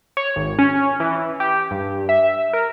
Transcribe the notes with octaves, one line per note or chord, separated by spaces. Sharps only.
C#5
G#1
C#4
E3
G4
G2
E5
A#4